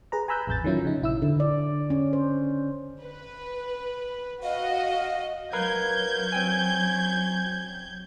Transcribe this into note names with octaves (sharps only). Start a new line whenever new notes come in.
G#4 B4 A#5
G#5 A#5 B5 E6 F#6 G6
A1 F2 G6 A6
D#3 F3 F#3 C#4 E4 F4
C#3 D#4
A#1 E4 E6
D3
D5
C#4
C5
B4
F#4 D#5 F5
F#3 A#4 B4 F5 G6 G#6
C4 G5 G#5